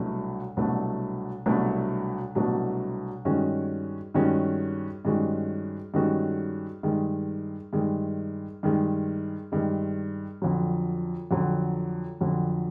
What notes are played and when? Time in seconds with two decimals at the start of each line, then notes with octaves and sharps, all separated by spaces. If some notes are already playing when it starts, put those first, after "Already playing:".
Already playing: C2 B2 F#3 A3 D4
0.57 C2 B2 F#3 A3 D4
1.46 C2 B2 F#3 A3 D4
2.35 C2 B2 F#3 A3 D4
3.25 G2 D#3 G#3 C#4 F#4
4.14 G2 D#3 G#3 C#4 F#4
5.05 G2 D#3 G#3 C#4 F#4
5.94 G2 D#3 G#3 C#4 F#4
6.83 G2 D#3 G#3
7.73 G2 D#3 G#3
8.63 G2 D#3 G#3
9.52 G2 D#3 G#3
10.42 F2 D3 F#3
11.31 F2 D3 F#3
12.21 F2 D3 F#3